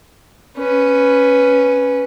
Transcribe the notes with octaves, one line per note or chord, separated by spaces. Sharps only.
C#4 B4